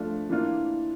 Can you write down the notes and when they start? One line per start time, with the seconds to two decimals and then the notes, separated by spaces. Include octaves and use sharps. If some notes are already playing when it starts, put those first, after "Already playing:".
Already playing: F3 A3 D4 F4
0.30 E3 A#3 D4 F4